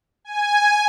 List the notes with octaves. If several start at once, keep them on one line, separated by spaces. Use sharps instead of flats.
G#5